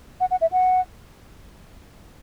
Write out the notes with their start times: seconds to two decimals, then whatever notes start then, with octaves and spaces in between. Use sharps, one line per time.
0.20 F#5
0.31 F#5
0.41 E5
0.52 F#5